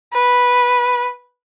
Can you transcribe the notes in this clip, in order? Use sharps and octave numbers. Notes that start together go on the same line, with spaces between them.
B4